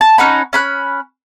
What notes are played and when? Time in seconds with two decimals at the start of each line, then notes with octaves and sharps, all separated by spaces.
0.01 A5
0.18 C#4 D#4 F#5 B5
0.53 C#4 B5 F#6